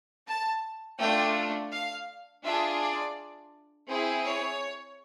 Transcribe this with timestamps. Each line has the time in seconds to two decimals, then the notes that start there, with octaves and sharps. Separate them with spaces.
0.27 A5
0.99 A3 D4 F4 G5
1.72 F5
2.44 D4 F4 G#4 E5
2.81 D5
3.89 C4 E4 G#4
4.25 C#5